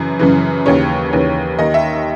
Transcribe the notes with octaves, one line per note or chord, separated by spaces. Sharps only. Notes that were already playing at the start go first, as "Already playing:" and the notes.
Already playing: F#2 C#3 E3
F#2 C#3 E3
D#2 C#3 E3 C#5
D#2 C#3 E3
D#2 D#3 D#5
E5